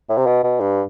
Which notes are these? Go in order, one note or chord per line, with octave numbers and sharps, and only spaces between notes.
A2
C3
B2
B2
G2